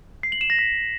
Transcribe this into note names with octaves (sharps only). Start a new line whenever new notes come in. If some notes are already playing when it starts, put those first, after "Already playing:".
C7
F#7
E7
A#6
B6